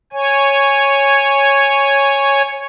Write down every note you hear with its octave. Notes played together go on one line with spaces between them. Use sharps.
C#5 G#5